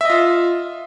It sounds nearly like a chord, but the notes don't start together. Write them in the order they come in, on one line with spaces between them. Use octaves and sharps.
E5 D#5 F4